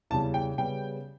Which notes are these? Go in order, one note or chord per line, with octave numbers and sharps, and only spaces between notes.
E2 C#3 G3 A5
G5
C#3 G3 B3 G5